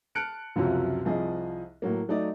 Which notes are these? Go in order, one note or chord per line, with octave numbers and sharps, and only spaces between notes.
A5 F6 F#6 C#7 D7
C#2 F#2 C3 F3 F#3
C2 F3 G#4 D#5
A2 F#3 A#3
F#3 A3 D#4 D5 D#5